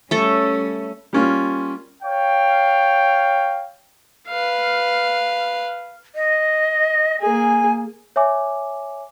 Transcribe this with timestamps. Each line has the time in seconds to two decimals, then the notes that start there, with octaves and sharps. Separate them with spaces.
0.11 G3 A3 C#4 A4
1.13 G3 A#3 C#4 F4
2.03 C#5 F5 G5
4.28 B4 F5
6.15 D#5
7.21 A#3 G#4 G#5
8.16 C#5 E5 G#5 D6